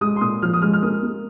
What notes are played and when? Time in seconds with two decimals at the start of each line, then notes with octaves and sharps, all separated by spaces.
0.01 G#3 D#6
0.16 C6
0.21 A#2 D#6
0.42 F3 F6
0.53 D#6
0.62 G#3 F6
0.73 F6
0.82 A#3 D#6
1.03 A#3